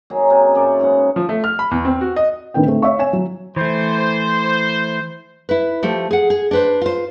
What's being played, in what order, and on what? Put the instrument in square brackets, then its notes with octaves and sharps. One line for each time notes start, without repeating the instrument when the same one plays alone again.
[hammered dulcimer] F#3 A#3 D#4 G#4
C3 C#4 G#5
F#2 D5 E5 C#6
G#2 C#3 B3 F#5
[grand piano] F3
A3
F6
B5
E2
C4
F#4
D#5
[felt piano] A2 D3 D#3 D4 B4 G5
A3 C4
C#5 E5 F5 C#6
C#5 G#5 E7
F#3
[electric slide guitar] E3 A3 [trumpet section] C5
[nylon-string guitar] E4 B4
F3 A3 G4
G#4 F#5
G#4
D4 B4 C5
F4 C5